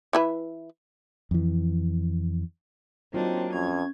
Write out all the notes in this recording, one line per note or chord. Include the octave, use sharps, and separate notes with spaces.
E3 E4 B4
F2 E3
F#3 A#3 C4 D4 D#4 F4
F2 C#4 G#6